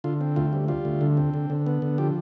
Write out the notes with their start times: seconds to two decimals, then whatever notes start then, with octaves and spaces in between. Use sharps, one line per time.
0.04 D3 F4
0.21 C4
0.36 D2 F4
0.53 G3
0.68 G3 F4
0.85 D2
1.01 D3
1.17 C4
1.34 D3
1.50 D3
1.66 B3
1.82 D3
1.98 F3 G4